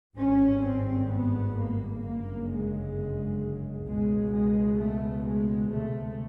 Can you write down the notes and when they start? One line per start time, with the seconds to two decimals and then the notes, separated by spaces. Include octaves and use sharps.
0.16 G#1 G2 C#4
0.62 C4
1.08 B3
1.55 A#3
2.01 G1 F#2 C#3 A#3
2.47 G#3
3.86 C#2 B2 G#3
4.32 G#3
4.79 A3
5.25 G#3
5.71 D2 C3 A3